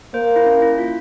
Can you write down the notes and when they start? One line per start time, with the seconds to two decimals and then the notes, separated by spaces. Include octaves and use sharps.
0.14 A#3 C5
0.36 E4
0.46 C#4
0.62 E4
0.78 F4